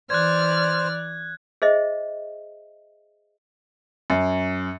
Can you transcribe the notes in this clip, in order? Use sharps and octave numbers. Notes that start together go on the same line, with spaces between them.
E3 C5 D5 F6 F#6 G#6
G#4 C5 D#5 E5
F#2